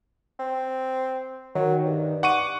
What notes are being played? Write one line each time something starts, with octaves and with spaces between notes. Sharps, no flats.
C4
D#3 F#3
G2
F#5 C#6 D6 D#7